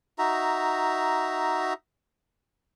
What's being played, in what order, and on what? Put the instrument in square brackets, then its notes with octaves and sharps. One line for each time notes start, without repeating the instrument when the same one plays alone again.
[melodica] D#4 F#4 E5 A#5